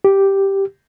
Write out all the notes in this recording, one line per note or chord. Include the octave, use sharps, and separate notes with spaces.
G4